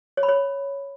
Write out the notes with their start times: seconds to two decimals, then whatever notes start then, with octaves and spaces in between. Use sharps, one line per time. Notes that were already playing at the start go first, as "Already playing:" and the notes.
0.17 C#5
0.23 B5
0.29 C#5